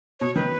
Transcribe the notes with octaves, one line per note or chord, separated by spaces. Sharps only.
B2 C#5
D#3 B4